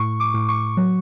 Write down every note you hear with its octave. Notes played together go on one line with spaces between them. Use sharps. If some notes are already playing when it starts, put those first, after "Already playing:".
Already playing: A2 C#6
D6
A2
C#6
F#3